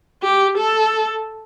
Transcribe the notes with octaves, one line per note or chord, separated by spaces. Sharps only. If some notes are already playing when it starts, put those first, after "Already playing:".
G4
A4